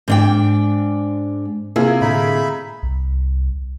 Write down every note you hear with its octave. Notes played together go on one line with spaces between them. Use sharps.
G#2 D4 G5
C3 A#3 E4 F4 G#4 E5
A2 D3 D#4 E5 B5
C2